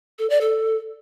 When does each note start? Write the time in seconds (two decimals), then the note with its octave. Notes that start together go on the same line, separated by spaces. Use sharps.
0.19 A4
0.30 D5
0.41 A4